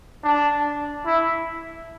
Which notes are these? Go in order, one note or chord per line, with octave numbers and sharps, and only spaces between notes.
D4
E4